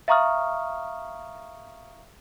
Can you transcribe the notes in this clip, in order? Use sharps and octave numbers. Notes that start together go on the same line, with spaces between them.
E5 F5 A#5 C#6 D#6 F6